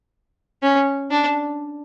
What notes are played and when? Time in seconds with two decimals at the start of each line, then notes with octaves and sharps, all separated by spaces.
0.63 C#4
1.11 D4